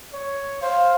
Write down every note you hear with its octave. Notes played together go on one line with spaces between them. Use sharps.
C#5
C5 F5